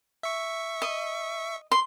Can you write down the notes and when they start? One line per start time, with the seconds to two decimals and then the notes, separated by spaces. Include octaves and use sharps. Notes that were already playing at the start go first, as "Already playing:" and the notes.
0.23 E5 C#6
0.82 D#5
1.72 C6